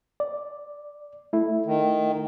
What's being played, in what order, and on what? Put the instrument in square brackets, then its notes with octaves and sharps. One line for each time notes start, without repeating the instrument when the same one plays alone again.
[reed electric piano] D5
A3 E4
[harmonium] D#3